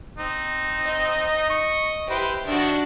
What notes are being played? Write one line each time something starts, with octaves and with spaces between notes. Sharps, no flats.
C4 D#4
D#5
C#6
E4 G4 B4 C5
D#3 D4 F#4 E5